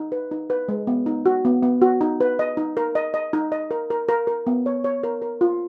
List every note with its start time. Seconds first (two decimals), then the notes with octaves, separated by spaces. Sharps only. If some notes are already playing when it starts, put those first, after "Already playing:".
Already playing: D#4
0.12 B4
0.31 D#4
0.50 B4
0.68 G#3
0.87 B3
1.06 D#4
1.26 F#4
1.45 B3
1.63 B3
1.82 F#4
2.01 D#4
2.21 B4
2.39 D#5
2.57 D#4
2.77 A#4
2.95 D#5
3.14 D#5
3.33 D#4
3.52 D#5
3.71 A#4
3.90 A#4
4.09 A#4
4.27 A#4
4.47 B3
4.66 C#5
4.84 C#5
5.03 A#4
5.22 A#4
5.41 F4